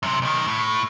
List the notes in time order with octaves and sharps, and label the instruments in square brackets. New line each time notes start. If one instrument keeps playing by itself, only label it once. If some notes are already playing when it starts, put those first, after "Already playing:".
[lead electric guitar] F#2 C3
B1 D#3
A2